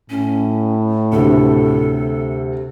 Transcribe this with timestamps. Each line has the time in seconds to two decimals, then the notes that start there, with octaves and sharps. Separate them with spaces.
0.10 A2 C#4
1.12 D2 C3 A4